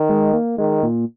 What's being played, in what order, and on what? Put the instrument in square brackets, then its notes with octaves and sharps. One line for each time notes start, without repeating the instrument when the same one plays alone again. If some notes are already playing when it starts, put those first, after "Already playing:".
Already playing: [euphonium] D#3
[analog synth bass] G#3
A#3
[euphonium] D#3 [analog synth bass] G#3
[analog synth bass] A#2